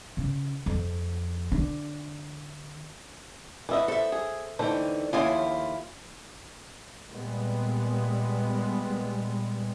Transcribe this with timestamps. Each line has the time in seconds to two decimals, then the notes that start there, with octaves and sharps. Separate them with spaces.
0.17 C#3
0.66 F2
1.52 D3
3.69 E3 B3 B4 D#5 E5
3.88 A4 C5 E5
4.12 G#4
4.59 D3 E3 A3 D#4 C5 G5
5.13 D#2 F3 C#4 E4 F4 D#5 F#5
7.07 A#2 G3 G#3 B3